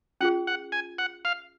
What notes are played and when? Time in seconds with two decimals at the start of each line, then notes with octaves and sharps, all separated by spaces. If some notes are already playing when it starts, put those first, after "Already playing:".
0.21 C#4 F4 G#4 F#5
0.47 F#5
0.72 G#5
0.98 F#5
1.25 F5